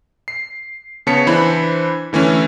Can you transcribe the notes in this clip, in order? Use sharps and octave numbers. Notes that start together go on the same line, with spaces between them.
C7
C#3 B3 C#5 A5 B6 C#7
E3 D4 C5 B5
D3 E3 A3 C#4 D4